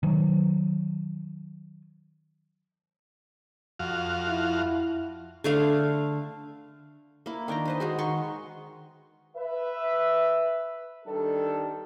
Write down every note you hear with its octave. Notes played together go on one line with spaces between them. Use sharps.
D#3 F#3
F2 F#4 F5
E4
D3 A3 F5
A#3 E4
D#3 D4 G5 A#5
B4 C5 D#5
G#3 F#4 G#4
D#3 C6 C#6
B4 E5
D#3 G3 D4 G4 A4